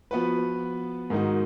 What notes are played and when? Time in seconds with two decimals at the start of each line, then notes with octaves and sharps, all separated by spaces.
0.11 F3 B3 F#4 B4
1.10 G#2 D#3 G#3 D#4 F#4